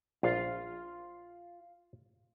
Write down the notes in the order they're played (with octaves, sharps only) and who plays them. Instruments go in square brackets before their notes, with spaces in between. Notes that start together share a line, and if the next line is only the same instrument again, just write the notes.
[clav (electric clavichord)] A#1 [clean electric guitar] F4 F5